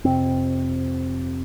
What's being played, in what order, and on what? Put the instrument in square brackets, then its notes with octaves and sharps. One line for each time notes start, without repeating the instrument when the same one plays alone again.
[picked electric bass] F2 C3 C4